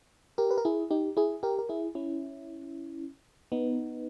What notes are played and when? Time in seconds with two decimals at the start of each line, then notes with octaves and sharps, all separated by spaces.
0.38 G4 A#4
0.51 B4
0.58 A#4
0.65 E4 G#4
0.91 D#4 G4
1.17 E4 G#4
1.43 G4 A#4
1.59 A#4
1.69 E4 G#4
1.95 C#4 E4
3.52 B3 D#4